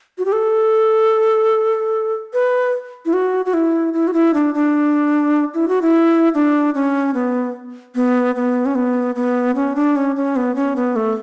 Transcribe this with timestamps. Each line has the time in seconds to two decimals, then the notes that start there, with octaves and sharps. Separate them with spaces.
0.18 F#4
0.25 G4
0.32 A4
2.34 B4
3.05 E4
3.13 F#4
3.46 F#4
3.54 E4
3.93 E4
4.08 F#4
4.13 E4
4.34 D4
4.55 D4
5.54 E4
5.68 F#4
5.82 E4
6.34 D4
6.75 C#4
7.15 B3
7.95 B3
8.36 B3
8.66 C#4
8.75 B3
9.15 B3
9.55 C#4
9.76 D4
9.96 C#4
10.16 C#4
10.36 B3
10.56 C#4
10.76 B3
10.96 A3